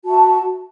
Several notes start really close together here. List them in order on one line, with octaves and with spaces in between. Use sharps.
F#4 A5 E5